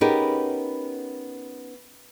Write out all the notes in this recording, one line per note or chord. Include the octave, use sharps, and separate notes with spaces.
B3 C#4 D#4 G4 G#4 A#4